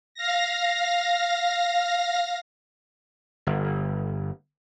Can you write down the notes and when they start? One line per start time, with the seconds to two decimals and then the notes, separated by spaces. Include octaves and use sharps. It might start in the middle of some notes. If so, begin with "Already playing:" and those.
0.15 F5 A#6
3.47 G1